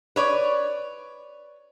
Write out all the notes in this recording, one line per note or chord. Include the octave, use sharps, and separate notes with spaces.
B4 C#5 D5